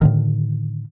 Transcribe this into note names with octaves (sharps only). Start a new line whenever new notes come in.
A2 D3 D#3